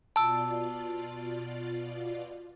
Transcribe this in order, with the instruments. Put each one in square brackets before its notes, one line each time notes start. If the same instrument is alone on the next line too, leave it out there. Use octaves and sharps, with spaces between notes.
[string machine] B2 F4 D5 [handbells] A5 E6